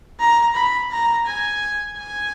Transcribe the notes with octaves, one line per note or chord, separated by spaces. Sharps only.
A#5
B5
A#5
G#5
G#5